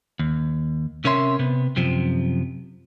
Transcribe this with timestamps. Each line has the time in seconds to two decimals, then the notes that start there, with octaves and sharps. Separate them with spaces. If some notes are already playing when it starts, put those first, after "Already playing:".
0.19 D#2
1.04 C3 C#4 A#4 C#5 E5 C6
1.39 C3 B3
1.76 F#2 C3 F3